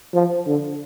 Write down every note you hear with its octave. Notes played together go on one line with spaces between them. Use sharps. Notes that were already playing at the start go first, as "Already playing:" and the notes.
F3
D3